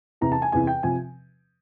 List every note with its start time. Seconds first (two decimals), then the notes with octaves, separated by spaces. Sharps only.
0.21 E2 C3 E3 A#5
0.32 A5
0.42 G#5
0.52 E2 C3 E3 G#5
0.67 G5
0.83 C3 F3 G#5